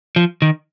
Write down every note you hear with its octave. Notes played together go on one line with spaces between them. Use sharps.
F3
D#3